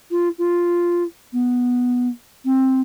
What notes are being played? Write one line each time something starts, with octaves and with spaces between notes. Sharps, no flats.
F4
F4
B3
C4